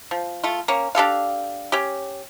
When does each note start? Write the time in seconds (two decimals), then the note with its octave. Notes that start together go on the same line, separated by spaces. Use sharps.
0.11 F3
0.44 A3 F4
0.68 A#3 C#4
0.95 D4 G4 A4 F5
1.72 C#4 G4